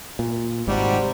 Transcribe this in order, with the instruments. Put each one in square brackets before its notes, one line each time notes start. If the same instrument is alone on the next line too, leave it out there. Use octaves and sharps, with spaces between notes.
[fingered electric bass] A#2
[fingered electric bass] G#1 G#2 [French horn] C3 [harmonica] G3 F#4